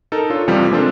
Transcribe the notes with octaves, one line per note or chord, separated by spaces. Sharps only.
D#4 A4 A#4
D4 F4 C#5
F2 C3 E3 F3 G3
G#3 A#3 C4 D4 F4 A4